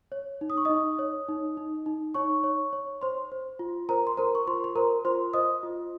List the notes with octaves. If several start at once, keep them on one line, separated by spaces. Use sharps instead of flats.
C#5
D#4
D#6
C#6
D#4 D#5 D#6
C#5
D#4
D#4
D#4
D#4 C#5 C#6
C#5
C#5
C5 C6
C5
F4
A#4 C5 A#5
C6
A#4 C5 A#5
C#6
F4 C5 C6
C6
A#4 C5 A#5
F4 C5 C6
C5 D#5 D#6
F4